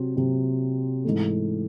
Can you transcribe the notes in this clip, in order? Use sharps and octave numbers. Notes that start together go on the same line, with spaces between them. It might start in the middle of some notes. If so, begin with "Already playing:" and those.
Already playing: C3 F#3 C4
C3 F#3 C4
G#2 E3 A3